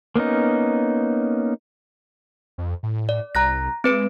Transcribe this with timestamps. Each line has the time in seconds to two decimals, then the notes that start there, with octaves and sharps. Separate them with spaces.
0.16 A#3 B3 C#4 D#4
2.58 F2
2.83 A2
3.09 D5
3.35 C2 A#5 F#6 A#6
3.84 G#3 C4 B4 D7